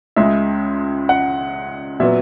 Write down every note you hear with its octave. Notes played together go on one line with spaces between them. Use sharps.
C#2 C#3 G#3 E5
F#5
A#2 F#3 B3 E5